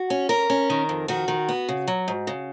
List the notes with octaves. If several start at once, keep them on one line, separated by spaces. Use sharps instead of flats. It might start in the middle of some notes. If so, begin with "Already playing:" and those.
Already playing: F#4
C#4
C#4 A#4
C#4
D#3
F2
D#3 F#4
D#3
B3
C#3
F#3
G#2
C#3